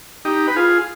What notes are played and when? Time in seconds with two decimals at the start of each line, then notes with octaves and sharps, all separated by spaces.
0.25 D#4 G4
0.48 B4
0.56 F4 G#4